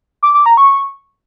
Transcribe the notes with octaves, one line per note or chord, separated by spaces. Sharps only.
D6
D6
A#5
C#6